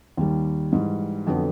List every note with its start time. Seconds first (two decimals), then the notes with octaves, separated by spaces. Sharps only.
0.17 D#2 D#3 G3
0.72 G#2 E3 G3
1.27 F2 D3 F#3 B3